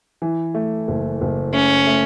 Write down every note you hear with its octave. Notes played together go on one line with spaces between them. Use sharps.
E3
A3
F#1
F#1
A3 C#4
A3